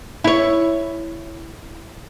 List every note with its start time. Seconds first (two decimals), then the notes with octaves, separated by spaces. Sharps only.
0.24 E4 C#5